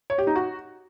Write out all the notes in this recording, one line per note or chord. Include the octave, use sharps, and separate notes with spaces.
C#5
G4
D#4
F#4